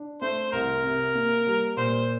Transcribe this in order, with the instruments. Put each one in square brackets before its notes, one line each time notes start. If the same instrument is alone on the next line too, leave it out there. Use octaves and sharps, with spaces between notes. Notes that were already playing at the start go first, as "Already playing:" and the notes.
Already playing: [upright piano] D4
[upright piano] A3 [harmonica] C5
[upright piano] C2 [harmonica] A#4
[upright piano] C3
A#3
G3
[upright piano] A#2 [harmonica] C5